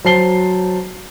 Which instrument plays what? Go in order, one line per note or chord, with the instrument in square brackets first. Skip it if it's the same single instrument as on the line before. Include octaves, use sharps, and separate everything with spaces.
[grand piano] F#3 C5 A5 C7 G7